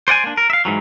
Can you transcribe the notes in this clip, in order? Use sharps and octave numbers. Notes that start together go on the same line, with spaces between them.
C5 D5 F#5 G#5
A#3 D4
A#4
E5 F5
G#2 E3 F#3